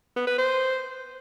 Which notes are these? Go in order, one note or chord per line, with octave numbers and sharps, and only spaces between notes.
B3
B4
C5